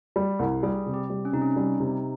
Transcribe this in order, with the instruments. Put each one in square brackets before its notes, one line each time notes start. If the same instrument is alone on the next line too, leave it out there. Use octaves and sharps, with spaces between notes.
[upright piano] G3
C2
[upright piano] G3 [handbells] G#4
[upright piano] C3
[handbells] G4
[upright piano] G3
[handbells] C#4
[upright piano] C3 [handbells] D#4
[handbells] C#4
[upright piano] G3 [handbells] D#4
[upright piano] C3